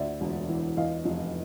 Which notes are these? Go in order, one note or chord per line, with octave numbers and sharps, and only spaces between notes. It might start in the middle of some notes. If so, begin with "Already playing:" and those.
Already playing: D2 D5 E5
E1
E3
E2 D#5 F5
F1